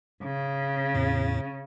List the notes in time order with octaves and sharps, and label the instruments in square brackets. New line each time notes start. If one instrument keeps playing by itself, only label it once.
[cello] C#3
[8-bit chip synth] E2 A2